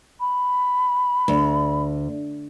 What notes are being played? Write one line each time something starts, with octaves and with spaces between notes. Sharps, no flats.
B5
D2